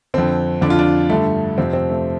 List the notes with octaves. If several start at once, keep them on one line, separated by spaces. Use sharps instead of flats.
F2 D3 C4
F2 D3 D4
F4
D4
G2 D3 A3
F2 C3 C4
C4
A3